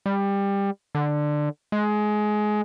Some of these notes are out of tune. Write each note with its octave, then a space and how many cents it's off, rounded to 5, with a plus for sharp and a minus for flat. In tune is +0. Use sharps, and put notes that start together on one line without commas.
G3 +20
D3 +15
G#3 +20